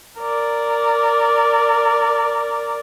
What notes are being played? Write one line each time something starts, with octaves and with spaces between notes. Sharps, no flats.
A#4 D5